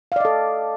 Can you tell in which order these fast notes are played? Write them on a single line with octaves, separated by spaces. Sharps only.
F5 D5 D#5 A4